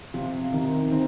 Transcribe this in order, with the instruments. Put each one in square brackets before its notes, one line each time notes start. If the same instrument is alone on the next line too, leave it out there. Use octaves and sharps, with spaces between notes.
[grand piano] C3 [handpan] F3 F4
[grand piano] C3 [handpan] D#3 D#4
[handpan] D#3 D#4 [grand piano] C4